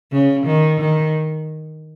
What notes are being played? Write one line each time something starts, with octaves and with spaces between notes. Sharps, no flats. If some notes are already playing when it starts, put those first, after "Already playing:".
C#3
D#3
D#3